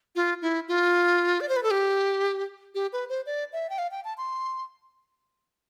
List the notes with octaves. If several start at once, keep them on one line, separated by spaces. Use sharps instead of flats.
F4
E4
F4
D5
C5
B4
A4
G4
G4
B4
C5
D5
E5
G5
F5
G5
A5
C6